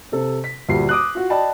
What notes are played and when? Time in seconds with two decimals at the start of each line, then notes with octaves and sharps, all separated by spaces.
0.12 C3 A4
0.44 B6
0.69 D2 A#2 G3 G4 C7
0.89 D6 D#6 F#6
1.15 F4 F#4
1.30 D5 D#5 G5 A5 B5